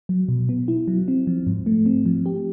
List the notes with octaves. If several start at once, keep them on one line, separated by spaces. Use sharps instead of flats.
F#3
B2
B3
E4
F#3
C4
F3
G#2
A3
C4
F3
G4